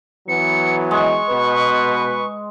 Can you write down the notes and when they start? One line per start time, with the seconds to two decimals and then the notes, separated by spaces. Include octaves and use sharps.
0.28 E3 F#3 B3 C#7
0.91 G#3 C#6
1.29 B2 B4